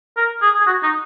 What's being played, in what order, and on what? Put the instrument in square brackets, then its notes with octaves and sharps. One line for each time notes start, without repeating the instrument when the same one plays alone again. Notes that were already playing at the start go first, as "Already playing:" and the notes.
[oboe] A#4
G#4
G#4
F#4
D#4